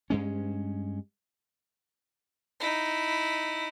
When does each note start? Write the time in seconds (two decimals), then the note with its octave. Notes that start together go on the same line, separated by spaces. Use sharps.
0.10 G2 G#3 C#4
2.60 D#4 E4